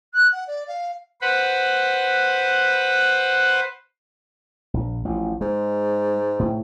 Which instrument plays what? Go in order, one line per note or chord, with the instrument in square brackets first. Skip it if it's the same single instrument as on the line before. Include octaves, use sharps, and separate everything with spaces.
[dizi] F#6
F#5
D5
F5
[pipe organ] B4 C5 F#5 B5
[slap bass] A#1
A1 F3
[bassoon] G#2 [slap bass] G#3
[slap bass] A2